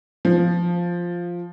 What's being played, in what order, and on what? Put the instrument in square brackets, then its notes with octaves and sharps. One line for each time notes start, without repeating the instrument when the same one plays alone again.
[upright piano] F3